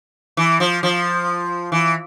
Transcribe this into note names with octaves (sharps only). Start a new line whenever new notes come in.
E3
F3
F3
E3